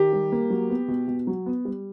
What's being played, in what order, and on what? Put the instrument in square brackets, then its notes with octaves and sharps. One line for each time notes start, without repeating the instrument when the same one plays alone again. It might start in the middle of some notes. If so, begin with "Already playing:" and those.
Already playing: [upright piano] D#3 G4
G3
A#3
F#3
B3
B2
B2
F#3
B3
G3